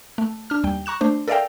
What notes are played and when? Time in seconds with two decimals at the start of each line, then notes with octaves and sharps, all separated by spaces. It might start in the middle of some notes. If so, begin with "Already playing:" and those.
0.18 A3
0.50 D4 F6
0.64 D#2 G3 G5
0.86 A#5 C#6 F#6 E7
1.01 A3 D4 C5
1.28 A4 A#4 D5 E5 F5 G5